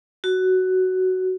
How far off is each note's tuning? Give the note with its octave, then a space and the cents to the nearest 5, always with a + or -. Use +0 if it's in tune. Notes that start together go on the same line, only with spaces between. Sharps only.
F#4 +10